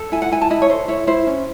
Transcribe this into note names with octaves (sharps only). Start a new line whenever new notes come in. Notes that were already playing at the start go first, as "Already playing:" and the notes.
Already playing: A4
E4 G#5
F#5
E4 G#5
A5
E4 D#5
C#5
A4 C5
E4 C#5
E4 C5
C#4